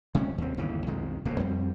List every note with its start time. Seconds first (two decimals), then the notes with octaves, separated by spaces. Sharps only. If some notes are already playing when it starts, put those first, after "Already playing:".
0.15 C3 G#3 C#4
0.38 D#2 C4
0.57 G1 D#2 C#3 E3
0.86 B1 F2 D#3 G#3
1.25 D1 F2 B2 A#3
1.39 F2 G3 C4